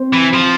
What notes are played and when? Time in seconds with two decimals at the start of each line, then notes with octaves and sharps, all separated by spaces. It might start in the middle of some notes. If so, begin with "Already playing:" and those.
Already playing: C4 C5
0.13 E3
0.33 F3